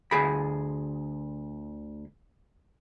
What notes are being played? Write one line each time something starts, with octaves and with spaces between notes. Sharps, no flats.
D2 G#4 B5